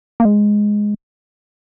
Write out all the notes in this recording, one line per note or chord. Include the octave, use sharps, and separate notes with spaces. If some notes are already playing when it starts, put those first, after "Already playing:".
A#3
G#3